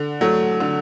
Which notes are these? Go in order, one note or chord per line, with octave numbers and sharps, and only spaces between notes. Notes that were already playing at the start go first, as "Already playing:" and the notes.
Already playing: D3
F#3 A3
D3